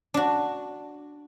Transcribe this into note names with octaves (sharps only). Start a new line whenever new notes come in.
D4 F#4